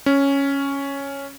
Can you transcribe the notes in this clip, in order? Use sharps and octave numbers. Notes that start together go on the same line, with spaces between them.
C#4